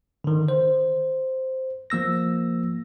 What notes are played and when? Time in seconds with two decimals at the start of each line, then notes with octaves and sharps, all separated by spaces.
0.24 D3 D#3
0.48 C5
1.90 F3 A#3 E6 A#6